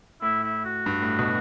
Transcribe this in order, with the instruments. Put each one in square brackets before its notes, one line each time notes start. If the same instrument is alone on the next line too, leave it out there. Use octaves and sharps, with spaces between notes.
[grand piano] A2 [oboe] E4
[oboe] E4
F#4
[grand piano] G2
A2
B2